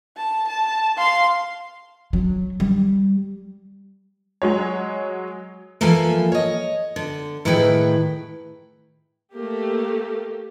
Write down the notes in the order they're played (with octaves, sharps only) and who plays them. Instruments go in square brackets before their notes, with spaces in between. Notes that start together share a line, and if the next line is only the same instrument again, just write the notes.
[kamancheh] A5
A5
F5 C6
[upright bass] F#3
G3
[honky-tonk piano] F#3 G#3 C#5
[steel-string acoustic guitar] E3 F3 A#3 A4 F5 G#5
C#5 D#5
D3
A2 D#3 E4 G#4 B4 G5
[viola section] A3 A#3 G4 A#4